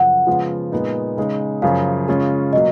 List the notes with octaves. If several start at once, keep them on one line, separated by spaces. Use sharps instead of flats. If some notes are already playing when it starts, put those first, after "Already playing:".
Already playing: F#2 C#3 F3 F#5
C#3 F3 G#3 B3 F4
A#2 G#3 B3 D#4
C#3 G#3 D#4
F#2 C#3 F3 F5
C#3 G#3 C#4 F4
B2 F#3 A#3 D#5